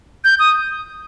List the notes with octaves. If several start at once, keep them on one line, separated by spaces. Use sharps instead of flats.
G6
D#6